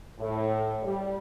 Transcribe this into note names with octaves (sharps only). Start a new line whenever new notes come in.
A2
G3